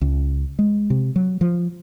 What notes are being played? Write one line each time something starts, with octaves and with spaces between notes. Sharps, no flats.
C#2
G#3
C3
F#3
F3